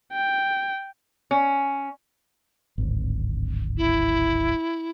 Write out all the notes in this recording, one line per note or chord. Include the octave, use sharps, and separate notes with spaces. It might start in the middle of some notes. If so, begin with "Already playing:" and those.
G5
C#4
D1 G#1
E4